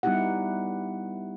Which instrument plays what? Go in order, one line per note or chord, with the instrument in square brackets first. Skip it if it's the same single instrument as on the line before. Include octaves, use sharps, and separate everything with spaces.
[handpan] G3 B3 D#4 E4 G4 F#5